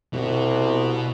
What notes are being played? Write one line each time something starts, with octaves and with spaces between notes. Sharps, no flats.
C2 B2 F#4